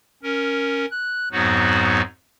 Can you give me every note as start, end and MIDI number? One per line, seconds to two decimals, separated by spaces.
0.23 0.86 61
0.23 0.86 70
0.91 1.29 90
1.32 2.02 41
1.32 2.02 44
1.32 2.02 54
1.32 2.02 59
1.32 2.02 63
1.32 2.02 66